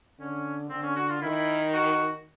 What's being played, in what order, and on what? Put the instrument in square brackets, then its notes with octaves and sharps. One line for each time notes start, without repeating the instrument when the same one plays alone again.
[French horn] D3 [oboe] C#4
[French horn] D3 [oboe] C4
[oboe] C#4
F#4
F4
[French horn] D#3 [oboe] E4
[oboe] F#4